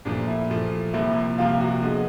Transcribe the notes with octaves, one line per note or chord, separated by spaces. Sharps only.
A#2 F3 A3 D4
E4
A#2 F3 A3
C2 C3 F3 A#3 E4
C2 C3 F3 A#3 F4
F#4
D3 F3 G#3 B3